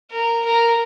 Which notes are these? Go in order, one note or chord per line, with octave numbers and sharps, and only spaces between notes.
A#4
A#4